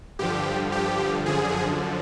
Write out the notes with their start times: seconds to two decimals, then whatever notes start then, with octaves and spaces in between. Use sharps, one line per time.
0.19 G2 D3 F3 G4
0.72 G4
1.26 F#2 D3 F3 G#4